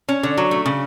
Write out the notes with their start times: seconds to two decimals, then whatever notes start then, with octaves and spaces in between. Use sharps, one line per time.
0.09 C#4
0.23 D3
0.38 F#3
0.51 A3
0.66 C#3